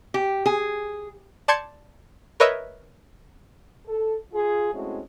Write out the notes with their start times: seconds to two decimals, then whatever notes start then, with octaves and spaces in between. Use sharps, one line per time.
0.14 G4
0.46 G#4
1.48 D5 A5 C6 G6 G#6 C#7
2.40 A#4 B4 C#5 D#5 E5
3.86 A4
4.32 F4 G#4
4.73 G#3 A3 C4 C#4 E4 F#4